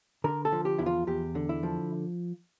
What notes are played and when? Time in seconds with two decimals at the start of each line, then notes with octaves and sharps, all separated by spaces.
0.24 D3 A#4
0.45 A4
0.52 F3
0.65 G4
0.78 E2 E4
0.86 F4
1.07 E2 G4
1.35 D3
1.49 E4
1.63 F3